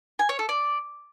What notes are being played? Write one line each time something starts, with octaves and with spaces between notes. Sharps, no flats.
G#5
C#5
A4
D5